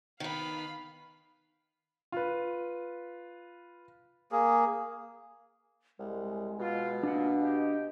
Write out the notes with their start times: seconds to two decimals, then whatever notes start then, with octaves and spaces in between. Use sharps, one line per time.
0.20 D#3 B3 F5 B5
2.12 F4 B4
4.32 A#3 G#4
5.99 C2 G#3
6.59 B2 F4
7.03 A#2 D4 F5 F#5
7.41 G4 D#5